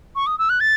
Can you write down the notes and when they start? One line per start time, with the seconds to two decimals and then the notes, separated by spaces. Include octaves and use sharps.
0.16 C#6
0.27 D#6
0.39 E6
0.50 F#6
0.60 A6